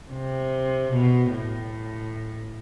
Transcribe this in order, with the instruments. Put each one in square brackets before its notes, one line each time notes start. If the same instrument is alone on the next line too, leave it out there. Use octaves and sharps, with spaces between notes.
[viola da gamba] C3
B2
A2